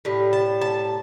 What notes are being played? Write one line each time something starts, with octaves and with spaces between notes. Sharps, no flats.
A2 G3
A5
A5